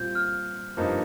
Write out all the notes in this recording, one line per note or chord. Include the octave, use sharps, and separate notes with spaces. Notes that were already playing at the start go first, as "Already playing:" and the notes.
Already playing: A#2 G3 C4 F4 G6
F6
G2 F3 A#3 D#4